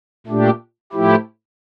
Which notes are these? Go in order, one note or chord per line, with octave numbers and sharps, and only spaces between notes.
A#2 A3 D4 G4
A2 F3 A3 E4 G4